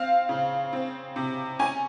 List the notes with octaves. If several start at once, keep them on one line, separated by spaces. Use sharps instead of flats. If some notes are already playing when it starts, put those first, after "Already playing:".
Already playing: C4 F5
C#3
C4
C3
C#4 G#5